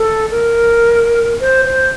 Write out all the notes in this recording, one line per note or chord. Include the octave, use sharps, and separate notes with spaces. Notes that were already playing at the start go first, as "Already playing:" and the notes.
Already playing: A4
A#4
C5
C5